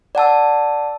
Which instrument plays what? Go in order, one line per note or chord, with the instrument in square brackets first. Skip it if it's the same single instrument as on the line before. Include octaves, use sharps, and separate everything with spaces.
[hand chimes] D5 F#5 A5 E6